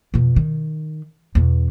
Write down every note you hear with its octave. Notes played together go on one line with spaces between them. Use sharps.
F2 B2
D#3
E2 B2